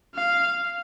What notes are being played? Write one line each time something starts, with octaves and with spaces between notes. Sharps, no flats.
F5